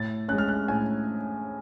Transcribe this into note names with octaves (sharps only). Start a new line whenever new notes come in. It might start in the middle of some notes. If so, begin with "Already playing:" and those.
Already playing: A2 A6
G#3 C#4 F#6
F6
F#6
A2 G#5